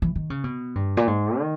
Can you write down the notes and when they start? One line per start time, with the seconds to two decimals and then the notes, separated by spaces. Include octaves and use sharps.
0.02 E3
0.15 D#3
0.30 C#3
0.44 B2
0.75 G2
0.97 A#2
1.07 G#2
1.39 D#3